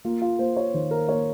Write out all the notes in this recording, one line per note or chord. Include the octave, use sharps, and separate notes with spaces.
A#3 F4
F4
A#3 C5
C#5
D#3 C5
A#4
A#3 C#5